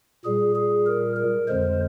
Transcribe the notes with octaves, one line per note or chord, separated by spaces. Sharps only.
A#2 G3 G#4
G#4
A#4
A#4
F2 D3 G#3 C5